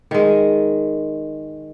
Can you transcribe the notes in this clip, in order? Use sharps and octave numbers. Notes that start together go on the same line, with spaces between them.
D#3 G#3